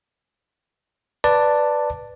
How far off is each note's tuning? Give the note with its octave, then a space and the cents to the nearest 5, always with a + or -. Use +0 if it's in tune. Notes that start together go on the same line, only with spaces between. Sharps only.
B4 +0 D5 +0 A5 +15